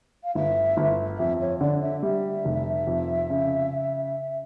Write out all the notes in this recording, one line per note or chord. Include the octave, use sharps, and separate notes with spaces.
F5
G1 E5
G1
F2 E5
C#5
D3 D5
E5
G3 E5
F1
F2
C#3